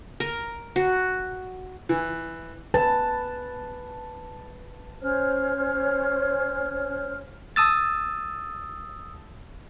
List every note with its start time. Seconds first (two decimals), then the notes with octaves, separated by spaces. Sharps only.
0.20 A#4
0.76 F#4
1.89 E3
2.74 B4 A5
5.01 C#4 C5 C#5 F6
7.56 A5 D#6 E6 A6